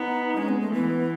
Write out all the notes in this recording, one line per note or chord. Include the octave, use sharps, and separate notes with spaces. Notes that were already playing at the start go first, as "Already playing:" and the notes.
Already playing: B3 D#4
G#3 C#4
B3
A3
E3 B3